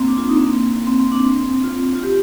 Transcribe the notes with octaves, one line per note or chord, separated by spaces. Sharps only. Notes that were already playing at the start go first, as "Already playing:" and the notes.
Already playing: A#3 C4
D4
F4
D#4
C4
A#3
C4
C4
D4
C4
F4
F4
G4